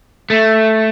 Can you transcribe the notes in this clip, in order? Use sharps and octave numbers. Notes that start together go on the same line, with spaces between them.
A3